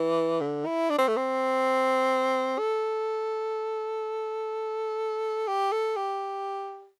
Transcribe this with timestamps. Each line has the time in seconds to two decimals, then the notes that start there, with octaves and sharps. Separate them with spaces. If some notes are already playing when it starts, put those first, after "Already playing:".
Already playing: E3
0.41 D3
0.66 E4
0.90 D4
0.98 C4
1.08 A3
1.17 C4
2.58 A4
5.48 G4
5.72 A4
5.96 G4